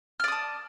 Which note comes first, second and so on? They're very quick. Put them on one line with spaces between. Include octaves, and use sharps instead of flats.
F6 D5 D#6 A5